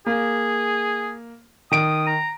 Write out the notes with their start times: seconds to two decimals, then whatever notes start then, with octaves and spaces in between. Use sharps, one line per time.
0.06 A#3 G#4
1.71 D#3 D#6 D7
2.06 A#5